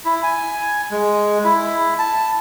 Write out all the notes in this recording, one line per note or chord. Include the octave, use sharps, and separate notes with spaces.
E4
G#5
G#3
E4
A5